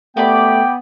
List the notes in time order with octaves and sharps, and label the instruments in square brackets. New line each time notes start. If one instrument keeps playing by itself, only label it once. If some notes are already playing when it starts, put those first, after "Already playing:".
[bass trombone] A3 [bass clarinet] B3 [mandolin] G4 D5 B5 [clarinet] G5